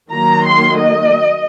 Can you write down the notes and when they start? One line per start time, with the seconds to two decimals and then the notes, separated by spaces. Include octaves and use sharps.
0.10 D#3 F#3 A#3 A#5
0.43 C6
0.74 D#5